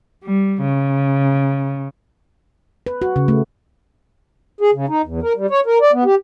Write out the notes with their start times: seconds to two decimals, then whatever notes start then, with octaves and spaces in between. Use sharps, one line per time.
0.24 G3
0.61 C#3
2.86 B4
3.02 F#4
3.16 C#3
3.28 A3
4.61 G#4
4.74 C#3
4.88 D#4
5.04 E2
5.22 A#4
5.36 G3
5.50 C#5
5.66 A#4
5.81 D5
5.93 B3
6.05 G4